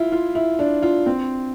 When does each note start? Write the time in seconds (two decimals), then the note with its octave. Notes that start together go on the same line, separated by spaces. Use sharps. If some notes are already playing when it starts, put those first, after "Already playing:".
Already playing: E4 F4
0.12 F4
0.35 E4
0.59 D4
0.83 F4
1.06 C4